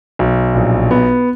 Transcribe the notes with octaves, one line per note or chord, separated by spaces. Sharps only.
B1
A#1
B3